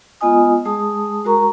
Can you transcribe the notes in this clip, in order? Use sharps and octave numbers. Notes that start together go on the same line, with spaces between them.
G#3 B3 F4 D#5 G#5 D#6
G#3 G#4 A5 D#6
G#3 F#4 A#4 A#5 C#6